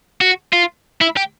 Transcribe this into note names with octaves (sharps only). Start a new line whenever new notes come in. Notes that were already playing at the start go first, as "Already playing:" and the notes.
F#4
F4
E4
G4